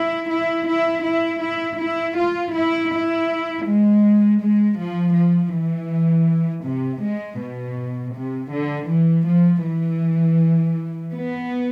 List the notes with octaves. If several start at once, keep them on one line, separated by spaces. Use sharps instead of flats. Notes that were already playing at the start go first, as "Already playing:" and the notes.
Already playing: E4
E4
E4
E4
E4
E4
F4
E4
E4
G#3
G#3
F3
F3
E3
C3
G#3
B2
C3
D3
E3
F3
E3
B3